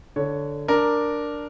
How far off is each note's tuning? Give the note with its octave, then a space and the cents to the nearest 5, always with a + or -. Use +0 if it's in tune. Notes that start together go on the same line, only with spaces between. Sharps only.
D3 +0 C#5 +5
D4 +0 A#4 +0